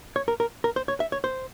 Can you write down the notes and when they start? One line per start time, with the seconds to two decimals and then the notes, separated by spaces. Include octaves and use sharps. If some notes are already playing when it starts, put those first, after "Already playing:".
0.16 C#5
0.28 A#4
0.40 A#4
0.64 A#4
0.76 C5
0.88 C#5
1.00 E5
1.12 C#5
1.24 C5